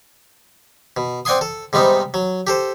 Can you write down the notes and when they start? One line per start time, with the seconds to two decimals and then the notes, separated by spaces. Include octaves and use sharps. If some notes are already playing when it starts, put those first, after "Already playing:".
0.97 B2
1.25 C4 D5 F#5 G#5 C6 D#6
1.41 A4
1.73 G#2 C3 G3 B3 D#4
2.14 F#3
2.47 G4 A4 C5